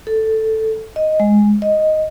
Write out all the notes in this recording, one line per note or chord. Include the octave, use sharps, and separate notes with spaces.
A4
D#5
G#3
D#5